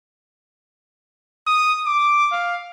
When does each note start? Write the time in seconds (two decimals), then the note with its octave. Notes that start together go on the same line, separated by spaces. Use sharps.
1.47 D#6
1.87 D6
2.32 F5